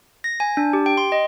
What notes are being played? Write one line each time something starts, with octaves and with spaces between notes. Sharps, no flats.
A#6
G#5
D4
G4
G5
C6
D#5